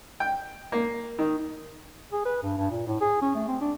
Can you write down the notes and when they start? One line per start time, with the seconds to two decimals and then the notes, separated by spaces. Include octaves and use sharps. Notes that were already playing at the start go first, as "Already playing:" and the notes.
0.20 G5
0.72 A#3
1.19 D#3
2.12 G#4
2.25 B4
2.43 G2
2.57 G2
2.71 A#2
2.87 A2
3.01 G#4
3.22 C#4
3.35 A3
3.47 C4
3.61 D4